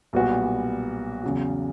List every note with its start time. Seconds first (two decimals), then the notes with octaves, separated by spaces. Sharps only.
0.13 B1 A#2 G3 B3 F#4
1.23 E2 C#3 F#3